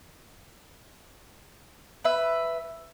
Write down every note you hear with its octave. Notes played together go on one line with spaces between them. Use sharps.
B4 E5